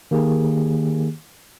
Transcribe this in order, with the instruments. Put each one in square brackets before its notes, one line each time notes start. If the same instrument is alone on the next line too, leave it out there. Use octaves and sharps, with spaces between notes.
[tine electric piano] D#3 A#3 G4 G#4